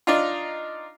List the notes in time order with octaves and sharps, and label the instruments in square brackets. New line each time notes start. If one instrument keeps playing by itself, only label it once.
[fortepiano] D4 D#4 F4